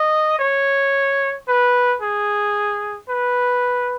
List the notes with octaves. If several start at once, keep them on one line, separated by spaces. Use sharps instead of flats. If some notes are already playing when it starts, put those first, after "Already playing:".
Already playing: D#5
C#5
B4
G#4
B4